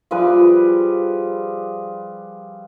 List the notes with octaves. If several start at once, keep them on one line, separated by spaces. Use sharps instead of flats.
F3 G3 G#4 B4